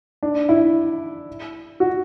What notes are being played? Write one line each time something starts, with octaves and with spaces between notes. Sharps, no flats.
D4
E4
F#4